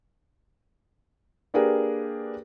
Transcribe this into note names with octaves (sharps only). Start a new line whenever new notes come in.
A#3 D4 G4 G#4 A#4 B4